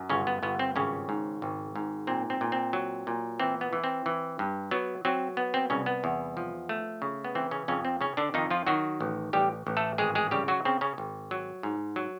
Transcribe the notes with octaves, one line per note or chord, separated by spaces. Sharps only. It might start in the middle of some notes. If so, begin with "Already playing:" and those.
Already playing: F#2
G1 C#3 C#4
B3
G1 B3
C4
G#1 C#3 C#4
G#2
G#1
G#2
A#2 C4
C4
A#2
C4
F#3
A#2
E3 C4
B3
E3
C4
E3
G2
F#3 B3
F#3 C4
B3
C4
C2 C#3 C#4
B3
E2
F3
A3
C#3
B3
E3 C4
C#3 C#4
F2 C#3 C#4
C4
C#3 C#4
D3 D4
F2 D#3 D#4
F3 F4
D#3 F#3 F#4
A1
A1 G3 G4
A1
A3 A4
G#1 G#3 G#4
G#3 G#4
C#3 G3 G4
F#3 F#4
C#3 C4
C#3 C#4
G#1
F#3
G#2
F#3